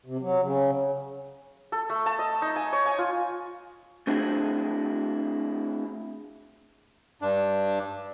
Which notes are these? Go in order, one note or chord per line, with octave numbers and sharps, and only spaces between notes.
C3
F#3
C#3
A4
A3
A5
D#5
D#4
G#5
C#5
G#5
F4
A3 C4 D4 E4 F#4 G#4
G2 D4